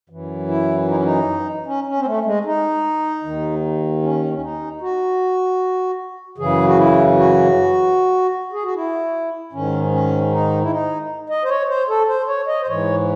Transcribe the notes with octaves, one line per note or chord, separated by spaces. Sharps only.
F#2 E3
E4
D#4
C#4
D#4
C#4
C#4
C4
A3
G#3
D#4
D#2 D#3
C#4
C#4
D#4
F#4
F#2 C#3 E3 G#4
F#4
E4
F#4
G#4
F#4
E4
G#2 D#3 C#4
C#4
D#4
E4
D#4
D#5
C5
C#5
C5
A4
C5
C#5
D#5
C5
G#2 E3 C#5